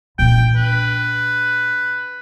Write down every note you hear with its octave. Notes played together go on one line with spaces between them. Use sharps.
A#2 D4 G5
B4